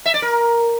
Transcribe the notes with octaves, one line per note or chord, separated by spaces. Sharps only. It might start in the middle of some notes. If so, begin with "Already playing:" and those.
E5
D5
A#4